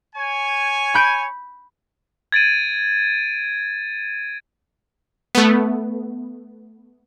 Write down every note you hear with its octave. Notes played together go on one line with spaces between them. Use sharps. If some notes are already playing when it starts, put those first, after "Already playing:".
C#5 G#5
B5 G6 D7
G#6 A6 D7 D#7
A3 B3